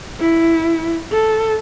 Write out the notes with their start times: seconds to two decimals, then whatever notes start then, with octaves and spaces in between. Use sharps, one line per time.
0.20 E4
1.12 A4